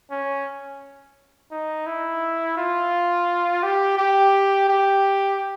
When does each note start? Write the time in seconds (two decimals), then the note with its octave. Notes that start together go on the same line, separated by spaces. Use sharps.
0.11 C#4
1.51 D#4
1.86 E4
2.57 F4
3.63 G4
3.97 G4
4.68 G4